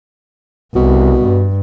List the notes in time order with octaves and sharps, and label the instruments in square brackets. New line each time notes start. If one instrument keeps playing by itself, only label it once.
[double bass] C2 [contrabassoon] B2
[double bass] G2